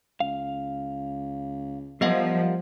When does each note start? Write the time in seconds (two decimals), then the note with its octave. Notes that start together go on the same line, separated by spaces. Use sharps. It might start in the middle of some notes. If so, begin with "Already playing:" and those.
0.20 C#2 F5
2.01 F3 G3 B3 A#4 D#5 F5 F#5